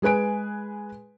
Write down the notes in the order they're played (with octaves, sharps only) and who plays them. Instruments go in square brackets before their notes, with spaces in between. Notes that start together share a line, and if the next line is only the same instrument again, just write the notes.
[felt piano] G#3 G#4 B4 G#5 D7